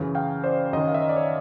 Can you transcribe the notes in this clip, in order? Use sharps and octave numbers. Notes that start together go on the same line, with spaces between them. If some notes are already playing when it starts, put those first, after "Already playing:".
Already playing: F#2 C#3 E3
F5 G5
C5 D5
F#2 D#3 C#5 D#5
F5
E5
D#5
D5
C#5